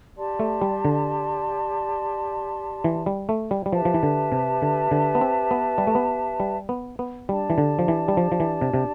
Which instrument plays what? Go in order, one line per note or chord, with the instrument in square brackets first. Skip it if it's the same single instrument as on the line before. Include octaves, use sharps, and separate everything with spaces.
[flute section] G4 D5 A5 C6
[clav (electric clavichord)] A3
G3
D3
E3
G3
A3
G3
G3
[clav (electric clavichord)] F3 [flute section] G4 B4 E5 A5
[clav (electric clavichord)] F3
E3
D3
C3
D3
D3
B3
C4
B3
G3
A3
B3
G3
B3
B3
[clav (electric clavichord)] G3 [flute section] D4 G4 D5 A5
[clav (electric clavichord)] E3
D3
F3
E3
G3
F3
F3
E3
C3
C3